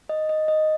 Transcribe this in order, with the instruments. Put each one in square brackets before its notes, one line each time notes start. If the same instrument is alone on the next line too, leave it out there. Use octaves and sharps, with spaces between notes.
[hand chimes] D#5
D#5
D#5